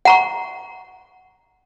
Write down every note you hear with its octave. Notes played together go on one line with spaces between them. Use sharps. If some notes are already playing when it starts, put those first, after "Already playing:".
F#5 A#5 C#6